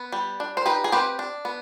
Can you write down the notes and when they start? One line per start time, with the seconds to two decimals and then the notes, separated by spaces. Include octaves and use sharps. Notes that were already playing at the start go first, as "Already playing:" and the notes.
Already playing: B3
0.12 G3
0.40 D4
0.57 C5
0.66 D#4 G4 B4
0.84 G#4
0.92 C4 G4 B4
1.19 D4
1.45 B3